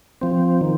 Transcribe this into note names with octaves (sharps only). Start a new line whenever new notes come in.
F3 C4
D#3